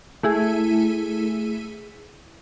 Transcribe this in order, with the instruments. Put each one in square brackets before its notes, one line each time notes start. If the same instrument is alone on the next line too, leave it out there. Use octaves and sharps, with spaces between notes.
[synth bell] A3 E4 G#4